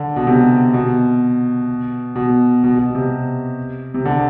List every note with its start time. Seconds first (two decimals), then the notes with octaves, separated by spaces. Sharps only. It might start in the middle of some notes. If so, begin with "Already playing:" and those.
Already playing: D3
0.16 B2
0.27 C3
0.74 B2
2.15 B2
2.64 B2
2.79 B2
2.95 C3
3.94 C3
4.05 D3